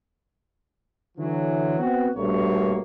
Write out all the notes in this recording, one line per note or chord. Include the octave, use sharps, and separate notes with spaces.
D3 E3 F#3
B3 C4 F#4
A#1 G2 B2 A3 A#3 C#5